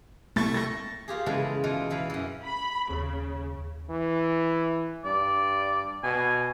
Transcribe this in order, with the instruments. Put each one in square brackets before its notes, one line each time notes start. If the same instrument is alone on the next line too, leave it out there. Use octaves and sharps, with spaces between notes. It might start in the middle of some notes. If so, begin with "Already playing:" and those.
[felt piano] C2 A6 [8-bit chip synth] A3 C#6
[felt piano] A6 A#6
[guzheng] A#3 F4 G4 G#4
C#3 E3 G#3 B3 A4
B2 E3 D#4 F4
E2 E3 F5 B5
F#2 E3
[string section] B5
[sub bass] D#2 [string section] C#3
[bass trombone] E3
[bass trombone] G2 [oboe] D5
[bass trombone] B2 [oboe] G#5